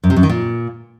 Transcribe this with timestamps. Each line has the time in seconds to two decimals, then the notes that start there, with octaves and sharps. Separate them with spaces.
0.04 F#2
0.10 C3
0.16 F#2
0.23 D#3
0.29 A#2